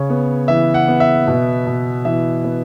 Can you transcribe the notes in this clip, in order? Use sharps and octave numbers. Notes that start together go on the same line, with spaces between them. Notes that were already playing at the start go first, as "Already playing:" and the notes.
Already playing: C#3 C#5
B3
E3 E5
F#5
B3
E5
B2
B2
E3 E5
B3